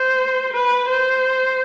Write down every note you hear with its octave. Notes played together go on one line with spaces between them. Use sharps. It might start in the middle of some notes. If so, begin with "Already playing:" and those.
Already playing: C5
B4
C5